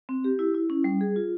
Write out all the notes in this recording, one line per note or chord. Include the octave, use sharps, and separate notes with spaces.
C4
G4
E4
E4
C#4
G3
G#4
F4